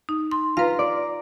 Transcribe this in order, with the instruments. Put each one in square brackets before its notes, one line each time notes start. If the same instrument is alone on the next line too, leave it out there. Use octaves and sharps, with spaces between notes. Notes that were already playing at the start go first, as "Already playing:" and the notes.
[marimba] D#4
C6
[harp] F4 A#5 C6 [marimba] B4 F5
[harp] D5